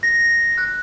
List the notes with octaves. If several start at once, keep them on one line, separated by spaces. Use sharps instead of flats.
A#6
F#6